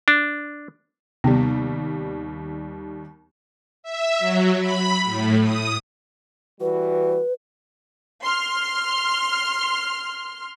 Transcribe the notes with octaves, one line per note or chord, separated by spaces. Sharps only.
D4
D#2 C3 G3 B3
E5
F#3
B5
A2
D#6
E3 G3 F#4 B4
C6 F6